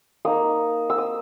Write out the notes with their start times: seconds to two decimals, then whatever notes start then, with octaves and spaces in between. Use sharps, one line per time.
0.25 A#3 D#4 D#6
0.90 E6
0.98 D#6